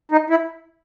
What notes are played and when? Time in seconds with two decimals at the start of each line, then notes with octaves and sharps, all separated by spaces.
0.12 D#4
0.30 E4